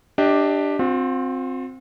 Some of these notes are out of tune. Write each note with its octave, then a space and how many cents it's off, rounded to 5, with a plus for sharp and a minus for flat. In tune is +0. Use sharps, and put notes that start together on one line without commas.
D4 +5 G4 +0 D#5 +35
C4 +0 F4 +45